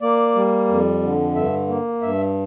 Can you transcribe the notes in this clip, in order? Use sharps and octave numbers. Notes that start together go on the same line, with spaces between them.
A#3 D5
G3
F2
D3
G2 E5
A#3
G2 E5